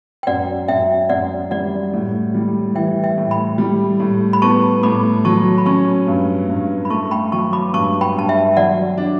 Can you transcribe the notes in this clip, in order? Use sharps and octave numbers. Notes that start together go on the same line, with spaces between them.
G5
F#2 D5 F#5
F#2 E5 G5
F#2 D5 F#5
G3 D5 F#5
A2
G3
E3 E5 G5
E5 G5
A2
G5 B5
G3
A2
B5
B3 A5 C#6
A2 B5 D6
F#3 A5 C#6
B5
C#4 A5 C#6
G2
G2
B5
A3 A5 C#6
G5 B5
F#3 A5 C#6
B5 D6
G2 A5 C#6
G5 B5
G2 A5
E5 G5
F#3 D5 F#5
D4